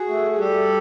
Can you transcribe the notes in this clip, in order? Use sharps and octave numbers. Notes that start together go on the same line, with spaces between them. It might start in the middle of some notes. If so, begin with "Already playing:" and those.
Already playing: F#4 G#4
A3
G#4
G3 G4 A4